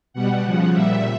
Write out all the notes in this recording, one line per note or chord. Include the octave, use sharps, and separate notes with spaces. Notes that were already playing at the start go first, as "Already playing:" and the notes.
B2 G3 F#5
C#3 F3
A#2 G3 E5